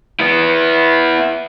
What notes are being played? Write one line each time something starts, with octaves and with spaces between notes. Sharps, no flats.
B3 E4